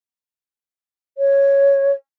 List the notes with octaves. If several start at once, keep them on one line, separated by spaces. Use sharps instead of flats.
C#5